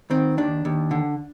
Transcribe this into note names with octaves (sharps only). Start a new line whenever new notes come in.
D#3 C4
D#2 D4
D#2
D3